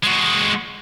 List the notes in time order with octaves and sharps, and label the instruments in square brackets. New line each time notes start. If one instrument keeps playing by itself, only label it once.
[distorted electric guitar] G#3 F#4